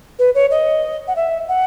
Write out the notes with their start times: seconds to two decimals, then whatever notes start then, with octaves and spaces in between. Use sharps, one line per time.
0.19 B4
0.35 C#5
0.51 D#5
1.08 F#5
1.16 E5
1.48 F#5